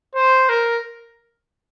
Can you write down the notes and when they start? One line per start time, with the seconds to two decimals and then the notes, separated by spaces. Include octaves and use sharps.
0.15 C5
0.49 A#4